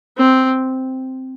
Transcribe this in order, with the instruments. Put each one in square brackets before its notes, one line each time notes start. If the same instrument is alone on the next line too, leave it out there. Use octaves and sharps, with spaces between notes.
[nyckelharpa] C4